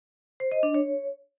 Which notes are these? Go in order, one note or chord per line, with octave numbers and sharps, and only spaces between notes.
C5
D#5
D4
C#5